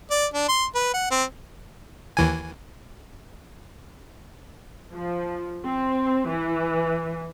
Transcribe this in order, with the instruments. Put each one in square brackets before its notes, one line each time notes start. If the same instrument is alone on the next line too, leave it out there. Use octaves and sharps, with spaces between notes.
[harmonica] D5
D4
C6
B4
F#5
C4
[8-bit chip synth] D#2 E3 G#5
[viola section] F3
C4
E3